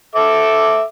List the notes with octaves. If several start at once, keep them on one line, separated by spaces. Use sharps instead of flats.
A4 E5 D6